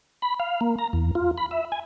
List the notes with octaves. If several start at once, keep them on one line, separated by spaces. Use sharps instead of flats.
B5
F5
A#3
A#5
E2
F4
B5
E5
G#5